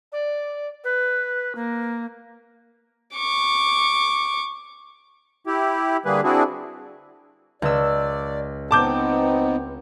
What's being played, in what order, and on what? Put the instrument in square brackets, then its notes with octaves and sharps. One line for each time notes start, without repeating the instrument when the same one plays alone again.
[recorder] D5
B4
A#3
[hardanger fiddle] C#6 D6
[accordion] E4 G4
D3 G3 A#3 G#4 B4
C4 D4 E4 F#4 G#4
[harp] C#2 E6 [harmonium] D5
[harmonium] B3 C4 D#4 [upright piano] A5 D6 G6